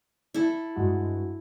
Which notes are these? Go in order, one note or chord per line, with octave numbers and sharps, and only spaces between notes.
E4 A4
G2 G#3 F#4